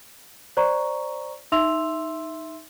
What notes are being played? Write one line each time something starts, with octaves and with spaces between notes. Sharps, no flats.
C5 D5 A#5 C#6
D#4 E5 C6 E6 F7